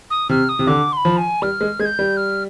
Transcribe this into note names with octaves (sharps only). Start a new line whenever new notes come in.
D#6
C3 F6
D#6
C3
D3 D6
C6
B5
F3
G#5
G3 F6
G#3
G#3 G#6
G6
G3
F6